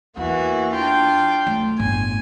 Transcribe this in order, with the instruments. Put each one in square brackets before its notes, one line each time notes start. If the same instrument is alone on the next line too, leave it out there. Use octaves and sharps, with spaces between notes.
[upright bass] E2 [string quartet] E3 A#3 F#4
[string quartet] D4 F4 G5
[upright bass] D2
[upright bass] G1 A2 [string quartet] G#5